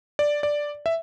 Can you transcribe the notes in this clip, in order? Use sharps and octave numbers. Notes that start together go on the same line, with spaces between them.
D5
D5
E5